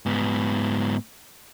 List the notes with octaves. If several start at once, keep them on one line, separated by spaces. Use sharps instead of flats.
G#2 B3